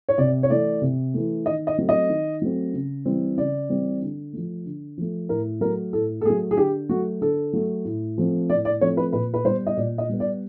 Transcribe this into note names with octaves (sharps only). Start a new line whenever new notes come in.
C#5
C3 D5
C#5
E3 A3 D5
C3
E3 A3
D#3 D#5
D#5
F#3 A3 C4
D#5
D#3
F#3 A3 C4
C#3
E3 G3 C4
C#3 D5
E3 G3 C4
D3
F3 A3
D3
F3 A3
A2 A#4
F#3 A3 A#4
A2 A4
A4
F#3 A3 G#4
G#4
D3 G4
F#3 A3 F#4
D3 A4
F#3 A3
A2
F3 A3 C4
A2 D5
D5
F3 A3 C4 C#5
B4
A#2 B4
B4
G3 C5
B3
D#5
A#2 D5
D#5
G3 B3
D5